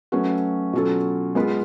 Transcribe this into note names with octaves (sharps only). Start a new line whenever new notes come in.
F#3 A3 C#4 F#4 B4
B2 F#3 C#4 F4 A4
G#3 B3 F4 B4